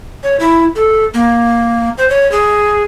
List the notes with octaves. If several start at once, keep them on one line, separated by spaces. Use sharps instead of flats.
C#5
E4
A4
A#3
C5
C#5
G#4